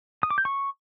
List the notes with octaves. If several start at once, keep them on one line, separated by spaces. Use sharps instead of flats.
D#6
D6
G6
C#6